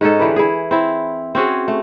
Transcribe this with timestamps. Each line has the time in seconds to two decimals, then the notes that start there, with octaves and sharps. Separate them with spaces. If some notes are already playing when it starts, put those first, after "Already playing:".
0.01 G#2 C#4 D#4 A4
0.19 D3 E3 G4 B4
0.36 E4 G#4
0.71 C4 E4
1.35 C4 C#4 F#4 G#4
1.68 A3